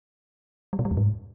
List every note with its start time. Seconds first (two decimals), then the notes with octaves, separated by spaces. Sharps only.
0.73 G3
0.79 B2
0.85 G3
0.91 E2
0.97 G#2